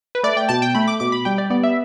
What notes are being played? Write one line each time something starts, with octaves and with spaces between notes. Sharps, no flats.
B4
A3 D5
G5
B2 A5
G5
A3 B5
D6
B2 D6
B5
G3 G5
D5
B3 D5
E5